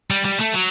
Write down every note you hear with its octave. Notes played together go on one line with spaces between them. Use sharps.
G3
G3
A3
F#3